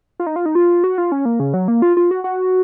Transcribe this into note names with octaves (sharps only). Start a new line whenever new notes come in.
F4
D#4
F4
D#4
F4
F#4
F4
C#4
A#3
C#3
F#3
A#3
F4
F4
F#4
F#4